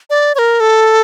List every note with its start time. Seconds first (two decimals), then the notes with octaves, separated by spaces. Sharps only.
0.10 D5
0.35 C#5
0.39 A#4
0.60 A4